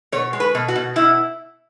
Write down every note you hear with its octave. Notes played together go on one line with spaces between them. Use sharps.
B2 C#5
G#3
B4
B2
F#4
B2
B2 E4